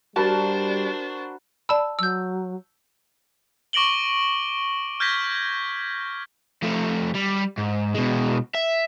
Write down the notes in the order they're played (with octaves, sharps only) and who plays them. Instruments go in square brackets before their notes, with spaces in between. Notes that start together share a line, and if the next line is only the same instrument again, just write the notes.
[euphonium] G3 [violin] D4 C5 [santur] F#4 A#4 B5 [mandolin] A5
[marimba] D5 B5 [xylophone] A5 E6
[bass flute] F#3 [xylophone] E6 G6
[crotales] C#6 D6 A#6 D7 F#7 G7
F6 G6 G#6 A#6 B6
[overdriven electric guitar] F3 A3
G3
G#2
B2 G#3
E5